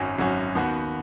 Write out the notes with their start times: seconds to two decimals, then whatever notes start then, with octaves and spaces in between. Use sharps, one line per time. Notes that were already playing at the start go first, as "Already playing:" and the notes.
Already playing: G#1 F#2 F#3 C#4 F#4
0.18 G#1 F#2 F#3 C#4 F#4
0.55 D#2 D#3 B3 F#4